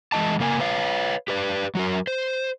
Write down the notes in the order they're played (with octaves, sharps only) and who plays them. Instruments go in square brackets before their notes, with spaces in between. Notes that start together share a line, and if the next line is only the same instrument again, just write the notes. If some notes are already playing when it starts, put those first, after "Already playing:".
[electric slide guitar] E3 G#3 D#4 D#5 A5
C#3 A#3 A#4 D5 G#5
B4 C#5 F5
G4 B4 D5
F#3 F#4 A#4
C5